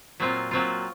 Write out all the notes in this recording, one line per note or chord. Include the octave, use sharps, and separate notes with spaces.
A#2 F#3 C4 F4
A#2 F#3 C4 F4